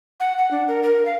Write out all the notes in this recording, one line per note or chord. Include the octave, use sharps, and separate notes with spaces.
F#5
F#5
D4
A#4
A#4
F5